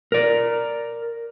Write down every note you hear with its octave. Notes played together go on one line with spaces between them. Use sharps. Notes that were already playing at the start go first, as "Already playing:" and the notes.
A#4 D5